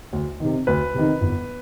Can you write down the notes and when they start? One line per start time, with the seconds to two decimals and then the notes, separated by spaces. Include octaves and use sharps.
0.13 D2
0.40 C3 D#3
0.67 D2 B4
0.94 C3 D#3
1.21 G1